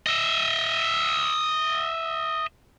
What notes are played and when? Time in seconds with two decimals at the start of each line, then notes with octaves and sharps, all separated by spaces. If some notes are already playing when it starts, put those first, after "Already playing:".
0.06 D#5 E5